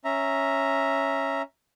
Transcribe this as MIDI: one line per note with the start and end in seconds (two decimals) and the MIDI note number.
0.05 1.42 61
0.05 1.42 76
0.05 1.42 82